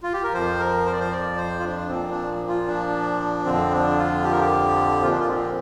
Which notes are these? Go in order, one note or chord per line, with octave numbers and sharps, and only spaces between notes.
F4
G4
A#4
F2 F3 C5
A#4
C5
D5
C5
D5
C5
F4
D4
A#2 F3 C4
D4
F4
D4
F2 D3 F3 C4
D4
F4
G4
A#4
G4
A#2 F3 F4
D4
F4
C4